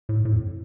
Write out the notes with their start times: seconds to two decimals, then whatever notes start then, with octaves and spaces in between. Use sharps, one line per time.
0.09 A2
0.25 A2
0.33 F2